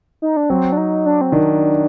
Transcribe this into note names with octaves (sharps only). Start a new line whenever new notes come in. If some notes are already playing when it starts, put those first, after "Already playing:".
D#4
D4
F#3 C4
D4
D#4
D4
C4
D#3 D4